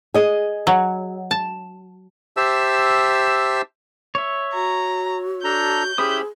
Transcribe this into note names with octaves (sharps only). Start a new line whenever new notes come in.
G#4 D#5
F#3
A5
G4 C5 E5 A5 E6
C#5 E5
F#4 A#5
D4 A4 A#5 G6
C#4 E4 G4 G#4 C5 B5 D#6